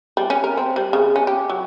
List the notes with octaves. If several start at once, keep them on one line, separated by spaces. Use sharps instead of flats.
G3
C#4
A#4
C4
G3
C#3
C#4
G4
F#3